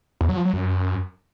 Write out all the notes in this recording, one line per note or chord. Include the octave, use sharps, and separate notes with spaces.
E2
F#3
F3
F#3
F#2